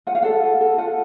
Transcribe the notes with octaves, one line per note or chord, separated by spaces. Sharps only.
F4 F#5
F5
A4 F#5
F4
A4
F4 F#5